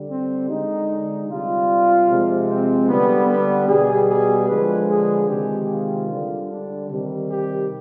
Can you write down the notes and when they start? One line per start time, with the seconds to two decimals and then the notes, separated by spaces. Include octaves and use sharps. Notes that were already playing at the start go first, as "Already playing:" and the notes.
Already playing: D3 G3
0.09 C4
0.48 D3 G#3 D#4
1.29 C3 G3 F4
2.09 C3 F3 G#3
2.49 C4
2.88 D3 G3 B3
3.29 B3
3.69 B2 G3 G#4
4.09 G#4
4.48 D3 F3 G#3 B4
4.90 G#4
5.29 C3 D#3 G#3 G4
5.70 F4
6.09 D3 G3
6.50 D4
6.89 C3 D#3 G3
7.30 G4